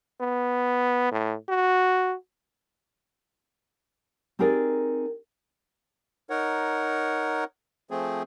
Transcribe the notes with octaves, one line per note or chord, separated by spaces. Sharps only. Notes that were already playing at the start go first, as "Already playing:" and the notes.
B3
A2
F#4
C4 D#4 G4 G#4 A#4 D5
D#4 A#4 C#5 F#5
F3 A3 C4 G#4